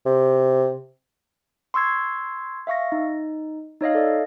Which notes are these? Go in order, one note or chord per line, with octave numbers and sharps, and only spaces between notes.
C3
C6 C#6 E6 G#6 C7
E5 F5 C#6 A#6
D#4
D#4 C#5 D#5 F5
A4 D5